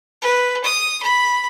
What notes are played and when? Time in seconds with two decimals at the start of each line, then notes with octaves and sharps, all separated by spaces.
0.22 B4
0.64 D#6
1.02 B5